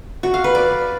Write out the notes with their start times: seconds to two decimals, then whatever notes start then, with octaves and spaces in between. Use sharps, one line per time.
0.23 F#4
0.34 F5
0.44 B4
0.55 D5